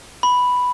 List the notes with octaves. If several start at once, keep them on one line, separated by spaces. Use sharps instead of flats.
B5